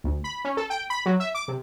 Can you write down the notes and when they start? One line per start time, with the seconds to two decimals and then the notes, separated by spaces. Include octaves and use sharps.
0.04 D2
0.24 B5
0.45 C#4
0.57 A4
0.70 G5
0.90 B5
1.06 F#3
1.20 E5
1.35 D6
1.48 C3